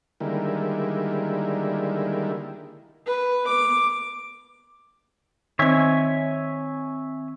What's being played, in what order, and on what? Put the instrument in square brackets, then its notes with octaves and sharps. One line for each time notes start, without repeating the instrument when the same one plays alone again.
[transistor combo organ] D3 D#3 G3 G#3 A#3 E4
[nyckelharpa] B4
D6
[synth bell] D#3 C4 [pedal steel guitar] C#5 E5 G#5